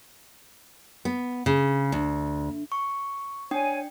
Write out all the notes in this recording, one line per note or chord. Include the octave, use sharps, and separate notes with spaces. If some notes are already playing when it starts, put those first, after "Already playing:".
B3
C#3
D2
C#6
D4 C#5 G5 G#5